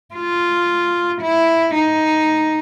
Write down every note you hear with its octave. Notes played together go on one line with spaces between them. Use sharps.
F4
E4
D#4